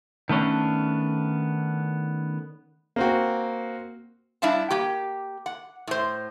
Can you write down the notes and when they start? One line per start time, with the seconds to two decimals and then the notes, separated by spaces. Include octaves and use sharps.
0.29 D#3 A3 B3 C#4 D4
2.96 A#3 C4 F#4
4.42 G3 D4 E4 F5 A5
4.71 A#3 G4
5.46 F#5
5.87 A2 C5